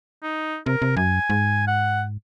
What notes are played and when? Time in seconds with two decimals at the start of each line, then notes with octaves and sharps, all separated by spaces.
0.23 D#4
0.66 C3 A#4
0.82 C3
0.97 F#2 G#5
1.30 G#2
1.68 F#5